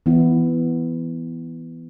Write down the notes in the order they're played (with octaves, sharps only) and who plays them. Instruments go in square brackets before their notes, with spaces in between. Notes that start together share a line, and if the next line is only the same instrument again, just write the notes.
[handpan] E3 B3 E4